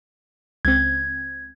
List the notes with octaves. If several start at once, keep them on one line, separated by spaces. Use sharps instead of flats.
C#2 C4 G#6